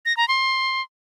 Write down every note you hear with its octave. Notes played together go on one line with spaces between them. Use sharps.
A#6
A#5
C6